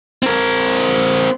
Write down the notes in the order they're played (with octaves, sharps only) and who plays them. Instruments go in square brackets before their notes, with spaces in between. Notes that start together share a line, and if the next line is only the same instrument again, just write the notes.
[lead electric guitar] C4 A#4